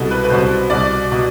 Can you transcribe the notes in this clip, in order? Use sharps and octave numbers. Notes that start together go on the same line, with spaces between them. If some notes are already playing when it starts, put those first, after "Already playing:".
Already playing: C2 B2 A4
B4
B4
C2 B2 C5
C2 B2 D5
B2